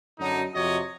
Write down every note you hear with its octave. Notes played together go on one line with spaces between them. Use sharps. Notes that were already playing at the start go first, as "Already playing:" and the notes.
F#2 D3 F#3 D#4
F2 C3 F#4 C#5 D#5